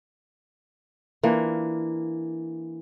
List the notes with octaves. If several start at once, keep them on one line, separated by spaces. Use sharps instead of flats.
E3 A#3 D4 F4